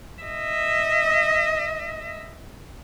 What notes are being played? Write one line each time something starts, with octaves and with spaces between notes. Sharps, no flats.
D#5 E5